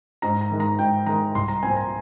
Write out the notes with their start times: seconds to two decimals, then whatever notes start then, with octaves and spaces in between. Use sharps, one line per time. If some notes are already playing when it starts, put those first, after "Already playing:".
0.22 G#2 A#5
0.41 A#5
0.51 D#3 G#3
0.60 A#5
0.79 G#2 G5
1.06 D#3 G#3 A#5
1.35 C2 C6
1.48 A#5
1.63 A#2 F3 C4 G#5
1.77 A#5